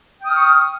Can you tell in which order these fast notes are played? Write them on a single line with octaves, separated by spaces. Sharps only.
G5 D#6 F6 C#6